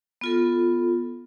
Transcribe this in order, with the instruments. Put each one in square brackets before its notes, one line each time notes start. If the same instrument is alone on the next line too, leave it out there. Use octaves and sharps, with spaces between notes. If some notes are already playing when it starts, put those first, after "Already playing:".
[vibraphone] B3 F4 A4